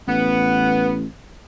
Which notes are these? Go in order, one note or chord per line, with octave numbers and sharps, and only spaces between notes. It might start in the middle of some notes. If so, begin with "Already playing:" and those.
A1 B3